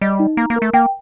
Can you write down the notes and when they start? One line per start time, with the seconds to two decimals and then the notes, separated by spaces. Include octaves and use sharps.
0.01 G3 D#5
0.20 D#4
0.37 A#3 A#5
0.50 A#3
0.56 A#4
0.62 A3
0.73 A#3 G5